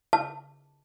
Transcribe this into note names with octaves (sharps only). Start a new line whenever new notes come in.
A5